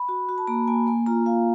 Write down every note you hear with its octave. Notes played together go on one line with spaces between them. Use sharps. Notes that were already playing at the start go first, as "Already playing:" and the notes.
Already playing: B5
F#4
F#4
A5
A#3 A#5
A#3 G#5
A#3 G#5
F4 A#5
F4 F5